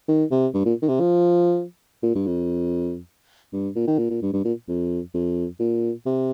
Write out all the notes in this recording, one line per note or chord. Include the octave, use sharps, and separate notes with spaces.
D#3
C3
G2
A#2
D#3
C3
F3
A#2
G2
F2
G2
A#2
D#3
A#2
A#2
G2
G2
A#2
F2
F2
A#2
C3